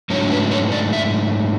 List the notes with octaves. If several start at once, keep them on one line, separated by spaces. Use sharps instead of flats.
G#2 F#3 A3 D4 C#5
B4
C#5
D5
E5